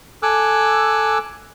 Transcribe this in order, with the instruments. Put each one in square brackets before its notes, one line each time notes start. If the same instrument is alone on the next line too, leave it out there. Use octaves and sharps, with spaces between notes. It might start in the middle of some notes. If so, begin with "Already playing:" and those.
[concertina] A4 G#5 D6 E6 F#6